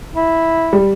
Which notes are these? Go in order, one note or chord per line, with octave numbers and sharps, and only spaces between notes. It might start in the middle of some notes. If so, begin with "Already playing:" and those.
E4
G3